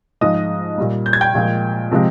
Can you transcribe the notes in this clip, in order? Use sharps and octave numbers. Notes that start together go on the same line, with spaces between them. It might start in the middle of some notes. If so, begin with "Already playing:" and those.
G#2 F3 G#3 D#5 D#6
A#2 G3
G6
G#6
G5 G6
A#2 F3 G#3
C3 F3 G#3